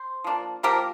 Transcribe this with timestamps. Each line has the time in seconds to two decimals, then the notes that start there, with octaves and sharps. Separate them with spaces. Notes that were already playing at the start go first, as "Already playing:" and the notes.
Already playing: C5
0.24 F3 A#3 D4
0.63 F3 A#3 D4 G4 A#4